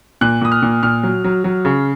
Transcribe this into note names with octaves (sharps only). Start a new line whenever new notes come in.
A#2 F#6
A#2 D#6
F6
A#2
A#2 F6
F#3
F#3
F#3
C#3